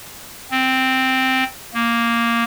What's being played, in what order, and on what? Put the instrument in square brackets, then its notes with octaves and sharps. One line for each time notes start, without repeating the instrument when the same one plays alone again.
[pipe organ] C4
A#3